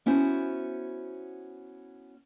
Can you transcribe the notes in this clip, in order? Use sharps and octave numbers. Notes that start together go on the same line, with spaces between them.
B3 C#4 E4 F#4 C5